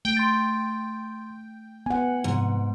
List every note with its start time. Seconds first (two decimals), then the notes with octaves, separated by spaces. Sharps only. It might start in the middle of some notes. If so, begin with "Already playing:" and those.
0.05 A3 G5
0.17 C6 A6
1.86 B3 F#5 G#5
2.24 G#2 C3 F3